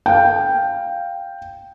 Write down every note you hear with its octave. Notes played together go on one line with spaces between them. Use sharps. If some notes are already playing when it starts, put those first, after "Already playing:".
F5 G5